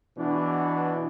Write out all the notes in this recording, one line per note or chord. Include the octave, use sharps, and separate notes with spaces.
B2 E3 B3 D4